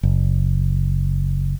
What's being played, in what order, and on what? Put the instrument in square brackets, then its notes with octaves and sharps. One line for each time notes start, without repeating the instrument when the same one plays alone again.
[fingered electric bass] F#1